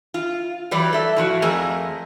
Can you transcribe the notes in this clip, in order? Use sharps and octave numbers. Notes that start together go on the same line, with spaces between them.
F4
E3 F#3 G3 B4 D5
A4 E5
A2 F3 F#4
F2 F3 A3 G#4 A#4